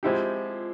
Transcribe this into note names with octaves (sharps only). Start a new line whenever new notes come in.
F3 G#3 C4 E4 G4